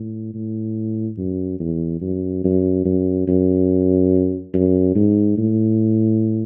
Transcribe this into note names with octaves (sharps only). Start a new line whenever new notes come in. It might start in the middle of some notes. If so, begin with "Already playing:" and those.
Already playing: A2
A2
F#2
E2
F#2
F#2
F#2
F#2
F#2
G#2
A2